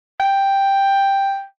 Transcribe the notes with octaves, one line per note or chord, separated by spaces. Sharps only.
G5